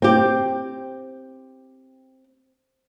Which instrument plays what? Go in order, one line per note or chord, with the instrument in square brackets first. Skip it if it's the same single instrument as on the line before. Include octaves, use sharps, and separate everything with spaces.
[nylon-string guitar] C4 G4